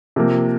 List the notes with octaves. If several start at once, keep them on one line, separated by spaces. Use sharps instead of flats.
C3 F3 A#3